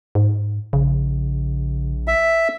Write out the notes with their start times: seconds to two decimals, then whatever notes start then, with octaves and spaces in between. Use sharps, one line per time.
0.15 G#2
0.73 A#1 C#3
2.08 E5